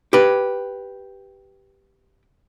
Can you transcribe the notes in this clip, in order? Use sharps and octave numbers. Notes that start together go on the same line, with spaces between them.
G4 B4